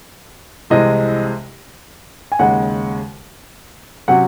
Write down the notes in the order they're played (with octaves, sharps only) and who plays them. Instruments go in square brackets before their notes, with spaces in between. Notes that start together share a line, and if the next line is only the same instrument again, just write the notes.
[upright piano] C2 C3 E3 G#3 C4 [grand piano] D#5
[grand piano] G#5
[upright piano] D#2 C#3 G#3 [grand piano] F#5
[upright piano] C3 F#3 C#4 F#4 [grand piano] F#5